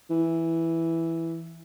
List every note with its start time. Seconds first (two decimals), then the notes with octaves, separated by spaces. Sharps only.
0.10 E3